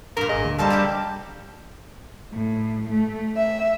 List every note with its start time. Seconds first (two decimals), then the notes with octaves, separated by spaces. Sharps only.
0.17 G2 A#2 A#4
0.29 G#1 G#4 D#5
0.45 D2
0.59 F#3 G3 A4 C5 F5 A5 A#5
0.70 D3 D4 G4
2.34 A2
2.89 A3
3.37 E5